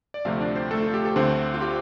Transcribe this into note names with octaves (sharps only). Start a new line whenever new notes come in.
D5
D2 C3 F3 A3 C4 F4 F5
D4 D5
C4 C5
A3 A4
F4
G4
A4
D2 D3 A3 C4 C5
F4
G4